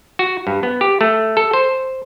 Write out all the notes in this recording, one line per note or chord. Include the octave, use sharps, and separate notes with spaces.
F#4
G2
B3
G4
A3
A4
C5